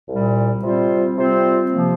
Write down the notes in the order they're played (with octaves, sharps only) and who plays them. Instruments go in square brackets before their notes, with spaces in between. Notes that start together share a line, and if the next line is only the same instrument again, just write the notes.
[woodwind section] C2 A#2 G3
C3 G3 C4 F4 C5
C3 G3 C4 F4 C5
C3 F3 A#3